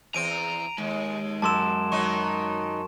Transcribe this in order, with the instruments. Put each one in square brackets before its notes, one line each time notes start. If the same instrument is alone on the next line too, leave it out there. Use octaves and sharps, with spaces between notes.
[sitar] E2 C4 [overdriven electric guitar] A#5 [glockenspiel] D7 D#7
[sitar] D#2 [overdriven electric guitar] G#3
[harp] F#2 E6 [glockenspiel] A5 C6 E7
[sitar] D#3 F#3 D#4 [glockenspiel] C#6